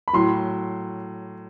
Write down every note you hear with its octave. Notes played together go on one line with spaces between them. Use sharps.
B5
A2 F#3 C6